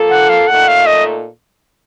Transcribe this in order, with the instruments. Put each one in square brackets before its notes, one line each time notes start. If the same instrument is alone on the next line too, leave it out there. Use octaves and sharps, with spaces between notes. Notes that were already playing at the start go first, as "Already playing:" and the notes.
Already playing: [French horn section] F3 A#3 F4 A4
[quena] F#5
F5
[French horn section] A#2 A3 D#4 A4 [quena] F#5
[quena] F5
D#5